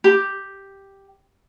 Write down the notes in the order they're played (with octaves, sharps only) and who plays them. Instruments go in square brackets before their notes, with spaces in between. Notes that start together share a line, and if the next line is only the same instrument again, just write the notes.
[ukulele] G4